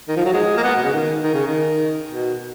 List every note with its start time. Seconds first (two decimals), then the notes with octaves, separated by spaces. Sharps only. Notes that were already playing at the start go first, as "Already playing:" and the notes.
0.09 D#3
0.17 F3
0.26 F#3
0.34 G#3
0.57 A#3
0.64 B3
0.76 B2
0.84 C#3
0.93 D#3
1.22 D#3
1.34 C#3
1.46 D#3
2.11 B2